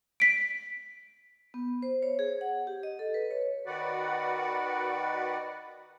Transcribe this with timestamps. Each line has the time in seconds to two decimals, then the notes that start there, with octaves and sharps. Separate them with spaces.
0.20 B6 D7
1.54 B3
1.82 C5
2.03 C#5
2.19 G#4
2.41 F#5
2.67 G4
2.83 D#5
2.99 A4
3.14 B4
3.31 C#5
3.66 D#3 F#4 B4 D5 F#5